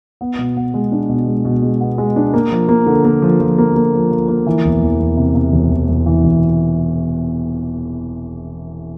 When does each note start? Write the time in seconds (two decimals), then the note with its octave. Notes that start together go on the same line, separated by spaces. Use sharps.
0.21 B3
0.38 B2
0.57 B3
0.74 G#3
0.92 D4
1.09 B2
1.27 G#3
1.45 B2
1.63 G#3
1.81 B3
1.98 G#3
2.16 D4
2.34 A#3
2.51 F3
2.69 A#3
2.86 D3
3.05 A#3
3.22 F3
3.40 F3
3.58 A#3
3.75 A#3
3.93 F3
4.11 F3
4.28 A#3
4.47 E3
4.64 E1
4.82 E2
5.00 E1
5.17 C3
5.35 C3
5.52 E1
5.70 E2
5.89 E2
6.06 E3
6.24 E1